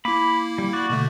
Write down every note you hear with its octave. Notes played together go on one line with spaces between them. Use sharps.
A#3 E4 B5 D6
G3
F#4 D5
B2 D3 A3